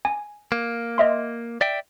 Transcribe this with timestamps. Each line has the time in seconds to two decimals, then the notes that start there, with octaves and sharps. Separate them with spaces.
0.05 G#5
0.52 A#3
0.98 D#5 E5 C6
1.61 D5 E5 G5